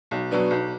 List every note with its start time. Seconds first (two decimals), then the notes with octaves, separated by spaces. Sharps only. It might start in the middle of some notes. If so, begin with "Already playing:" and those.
0.11 B1
0.31 B2 F#3 B3 D4
0.51 B1